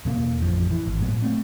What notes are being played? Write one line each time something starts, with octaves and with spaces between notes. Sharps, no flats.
E2 B2 A3 A#3
A1 F2 F3
E3
G#1
A2 F#3 B3
A3 C4